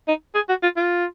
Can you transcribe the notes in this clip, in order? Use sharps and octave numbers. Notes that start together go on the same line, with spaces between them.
D#4
G#4
F#4
F4
F4